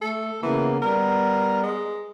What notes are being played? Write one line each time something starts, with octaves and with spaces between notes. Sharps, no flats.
A3 A4
C#3 E3 A#3 B3
G3 B3 A#4
G#3